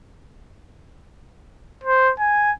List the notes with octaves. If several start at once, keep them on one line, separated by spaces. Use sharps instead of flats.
C5
G#5